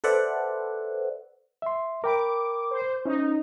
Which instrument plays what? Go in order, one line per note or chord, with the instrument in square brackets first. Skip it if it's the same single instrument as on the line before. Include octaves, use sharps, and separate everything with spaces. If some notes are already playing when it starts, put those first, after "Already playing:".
[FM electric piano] A4 B4 C5 D5 E5 F#5
[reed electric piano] E5 C6
[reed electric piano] A#4 G5 B5 [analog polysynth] D6
[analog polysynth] C5
[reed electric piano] C#4 [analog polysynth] D#4